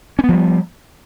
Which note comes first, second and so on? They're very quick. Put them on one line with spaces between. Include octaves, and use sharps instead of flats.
C#4 B3 F3 G3